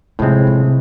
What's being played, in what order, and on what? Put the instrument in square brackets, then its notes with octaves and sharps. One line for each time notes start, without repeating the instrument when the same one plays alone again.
[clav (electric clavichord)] A2 F3 G#3 C4 E4 [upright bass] C3
[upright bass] C3